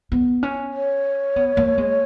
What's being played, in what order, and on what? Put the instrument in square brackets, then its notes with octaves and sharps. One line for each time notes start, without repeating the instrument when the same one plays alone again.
[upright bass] B3
C#4
[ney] C#5
[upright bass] B3
A#3
G#3